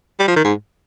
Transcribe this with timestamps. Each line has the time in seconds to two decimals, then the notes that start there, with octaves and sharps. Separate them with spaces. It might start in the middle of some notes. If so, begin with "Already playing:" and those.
0.19 G3
0.28 F3
0.36 D#3
0.44 G#2